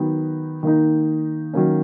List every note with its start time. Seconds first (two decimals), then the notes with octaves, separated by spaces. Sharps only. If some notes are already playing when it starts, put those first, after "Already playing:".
Already playing: D#3 F#3 B3 D#4
0.63 D#3 A#3 D#4
1.53 D#3 F#3 A#3 C#4